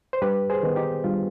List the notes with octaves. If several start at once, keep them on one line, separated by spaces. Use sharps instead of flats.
C5
G2 G4 B4
G#4 C5
D#3 B3
D#4 G4
G2 F4